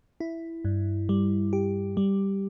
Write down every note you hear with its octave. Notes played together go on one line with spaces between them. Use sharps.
E4
G2
G3
G4
G3